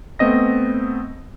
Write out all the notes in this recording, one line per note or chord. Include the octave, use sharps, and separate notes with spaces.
A3 B3 C4 D#5 A#6